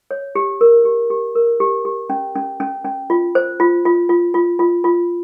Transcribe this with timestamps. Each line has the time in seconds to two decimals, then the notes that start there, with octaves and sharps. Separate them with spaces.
0.11 C#5
0.35 G4
0.61 A#4
0.85 G4
1.10 G4
1.36 A#4
1.60 G4
1.85 G4
2.10 C#4
2.35 C#4
2.60 C#4
2.85 C#4
3.10 F4
3.35 C5
3.60 F4
3.85 F4
4.09 F4
4.34 F4
4.59 F4
4.84 F4